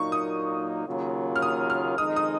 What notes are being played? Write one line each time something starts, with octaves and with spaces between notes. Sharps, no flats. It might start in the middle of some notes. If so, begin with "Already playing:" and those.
Already playing: A#2 F#3 A#3 D#4 C#6
D#6
D#2 C#3 F#3 A#3 F4
F6
D#6
F6
F2 D#3 G#3 D#4 D#6
D#6